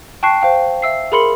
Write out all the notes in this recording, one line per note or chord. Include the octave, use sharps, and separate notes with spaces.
G5 A5 C#6 F#6 C7
C5 F5 G5
E5 E6 C7
G#4 A#4 B5 C6 C#7 F#7